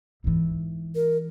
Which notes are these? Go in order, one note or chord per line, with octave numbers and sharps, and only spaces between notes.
G#2 E3
A#4